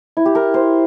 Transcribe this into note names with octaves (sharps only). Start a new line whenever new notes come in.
E4
G4
A#4
C5